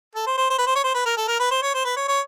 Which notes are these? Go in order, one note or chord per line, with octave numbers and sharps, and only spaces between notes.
A4
C5
C5
C5
B4
C5
C#5
C5
B4
A#4
A4
A#4
B4
C5
C#5
C5
B4
C#5
C#5